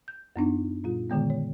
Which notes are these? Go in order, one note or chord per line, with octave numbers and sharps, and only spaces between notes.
G6
F#2 B3 D4 D#4
A#2 G3 F4
A#2 D3 D#3 G#3 B3
C#5